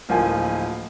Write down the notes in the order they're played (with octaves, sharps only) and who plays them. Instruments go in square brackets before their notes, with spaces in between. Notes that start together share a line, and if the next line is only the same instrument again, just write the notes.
[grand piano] D1 F3 A#3 G#5